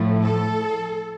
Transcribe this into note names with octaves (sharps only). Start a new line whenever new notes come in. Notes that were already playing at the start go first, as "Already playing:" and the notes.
Already playing: A2 F3 A3
A4